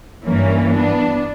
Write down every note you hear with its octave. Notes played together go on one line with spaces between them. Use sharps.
G2 E3 A#3 C#4
B3 D4